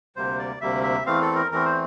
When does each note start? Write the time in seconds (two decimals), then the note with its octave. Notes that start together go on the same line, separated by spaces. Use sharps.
0.16 D2 C3 G3 A#3 C5
0.39 D5
0.61 D2 C3 G3 A#3 E5
0.84 E5
1.06 E2 E3 A3 C4 F5
1.22 A4
1.36 A#4
1.51 E2 E3 A3 C4 A#4
1.65 C5